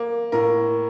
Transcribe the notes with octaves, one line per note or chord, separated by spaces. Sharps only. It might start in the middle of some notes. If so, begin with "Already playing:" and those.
Already playing: A#3
A2 A#4